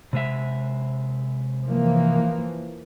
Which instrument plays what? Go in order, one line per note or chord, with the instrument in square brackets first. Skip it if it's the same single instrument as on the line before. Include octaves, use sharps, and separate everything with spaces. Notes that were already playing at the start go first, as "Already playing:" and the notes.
[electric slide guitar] C3 G#3 E5
[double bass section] E3 F3 A#3